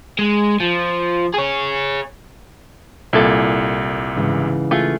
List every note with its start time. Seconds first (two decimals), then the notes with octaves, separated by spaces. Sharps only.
0.19 G#3
0.60 F3
1.34 G#4 C#5
3.13 C2 A#2 E4 A4
4.16 G#2 C#3 E3
4.71 A3 F4 G#4